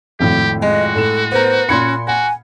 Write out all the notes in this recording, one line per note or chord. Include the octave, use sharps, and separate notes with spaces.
G#1 F2 A2 G4
G#3 F#4 D#5
A2 A4 E7
B3 A#4 C5
A#2 C#4 B5 C6 G#6 C#7
F#4 F#5 G#5